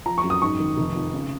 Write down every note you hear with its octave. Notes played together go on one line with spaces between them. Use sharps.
F3 A#5
C#6
F#2
D#6
G#2 C#6
D#3
F1
F2
C#3